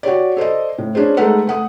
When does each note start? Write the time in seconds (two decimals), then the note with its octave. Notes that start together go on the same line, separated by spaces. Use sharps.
0.03 F#4 G4 C#5 D5
0.37 A4 C5 D5 D#5
0.78 A2
0.95 C#4 D4 G#4 C5
1.17 G#3 A3 D#4 A4 B4 F#5
1.47 A3 F#5 D#6